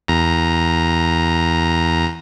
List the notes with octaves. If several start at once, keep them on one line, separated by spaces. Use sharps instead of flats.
E2 A#5